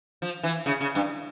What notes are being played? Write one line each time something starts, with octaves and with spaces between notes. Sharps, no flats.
F3
E3
C#3
C#3
G2